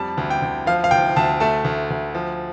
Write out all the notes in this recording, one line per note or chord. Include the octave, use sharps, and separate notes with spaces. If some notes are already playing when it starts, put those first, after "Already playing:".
Already playing: F2 G3 A5
D2
G5
D2
F3 F5
F5
D2 G5
D2 A5
A3 A5
D2
D2
F3